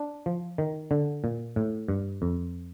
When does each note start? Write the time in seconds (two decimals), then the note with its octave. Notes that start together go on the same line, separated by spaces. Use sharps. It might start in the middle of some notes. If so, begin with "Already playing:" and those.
Already playing: D4
0.26 F3
0.58 D#3
0.91 D3
1.24 A#2
1.56 A2
1.88 G2
2.22 F2